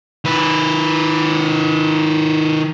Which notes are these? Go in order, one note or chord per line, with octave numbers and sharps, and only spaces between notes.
D#3 B4